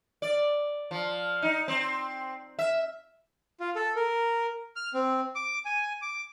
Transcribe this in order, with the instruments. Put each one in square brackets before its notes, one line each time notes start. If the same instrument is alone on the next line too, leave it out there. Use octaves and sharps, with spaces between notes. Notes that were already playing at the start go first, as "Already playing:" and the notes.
[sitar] D5
F3
D#4
C4
E5
[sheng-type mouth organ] F4
A4
A#4
F6
C4
D6
G#5
D6